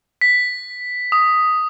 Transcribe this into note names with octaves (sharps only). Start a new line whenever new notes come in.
B6
D#6